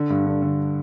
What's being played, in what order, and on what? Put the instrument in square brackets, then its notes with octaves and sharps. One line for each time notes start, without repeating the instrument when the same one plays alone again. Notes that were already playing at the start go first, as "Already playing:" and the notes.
Already playing: [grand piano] D3
G2
D3
D3